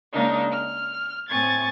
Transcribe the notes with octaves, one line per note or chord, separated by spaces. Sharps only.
C#3 G#3 A#3 D4 D#4 A#4
F6
A2 C4 G#5 C#6 G#6 A6